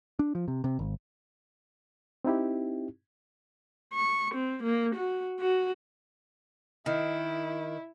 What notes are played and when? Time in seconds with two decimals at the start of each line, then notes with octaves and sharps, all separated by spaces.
0.19 D4
0.35 F3
0.48 C3
0.64 C3
0.79 G#1
2.25 C4 D#4 E4 G4
3.94 C#6
4.35 C4
4.63 A#3
4.95 F#4
5.40 F#4
6.86 D#3 E4